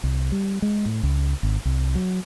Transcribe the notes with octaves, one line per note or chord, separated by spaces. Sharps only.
C2
G3
G#3
A2
C#2
G#1
C2
F#3